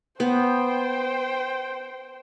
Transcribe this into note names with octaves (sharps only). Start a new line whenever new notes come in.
B3 C5 G5